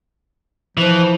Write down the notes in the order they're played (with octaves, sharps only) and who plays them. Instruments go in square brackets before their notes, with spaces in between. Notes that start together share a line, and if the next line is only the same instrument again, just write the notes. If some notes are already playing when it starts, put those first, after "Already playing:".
[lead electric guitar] E3 [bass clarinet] F3